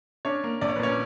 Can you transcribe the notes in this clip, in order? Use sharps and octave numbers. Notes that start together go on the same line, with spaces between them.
C#4 D4 C#5
A#3
A#1 D5
C#5
B4
A#2 C#4 C#5